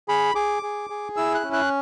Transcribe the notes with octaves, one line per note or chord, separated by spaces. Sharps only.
G#4 B5
G#4 D6
G#4
G#4
E4 E6
F#6
C#4
F#6